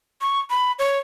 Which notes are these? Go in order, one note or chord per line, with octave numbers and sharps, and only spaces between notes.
C#6
B5
C#5